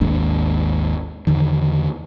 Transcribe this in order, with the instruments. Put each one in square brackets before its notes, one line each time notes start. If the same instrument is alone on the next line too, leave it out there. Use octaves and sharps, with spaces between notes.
[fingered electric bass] G#1 D#2 G#3 D4
E2 D3 D#3